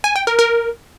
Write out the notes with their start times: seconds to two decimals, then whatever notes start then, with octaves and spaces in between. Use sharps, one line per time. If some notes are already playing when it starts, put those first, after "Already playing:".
0.04 G#5
0.16 G5
0.27 A#4
0.39 A#4